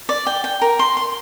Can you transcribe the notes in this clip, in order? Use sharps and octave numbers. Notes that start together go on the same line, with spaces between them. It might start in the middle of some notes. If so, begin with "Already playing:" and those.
D5
G5
G5
A#4
C6
C6